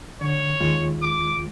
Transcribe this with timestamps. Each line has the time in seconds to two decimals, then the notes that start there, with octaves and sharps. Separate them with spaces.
0.21 D3 C#5
0.60 D#2 G#3 F4
1.02 D6